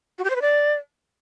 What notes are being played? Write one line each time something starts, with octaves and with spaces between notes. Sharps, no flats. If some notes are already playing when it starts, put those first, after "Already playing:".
F#4
G4
C5
B4
D5